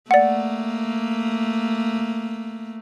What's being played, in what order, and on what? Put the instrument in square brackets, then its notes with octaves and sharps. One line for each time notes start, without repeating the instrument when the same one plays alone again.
[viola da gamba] A3 A#3 [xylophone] D5 F#5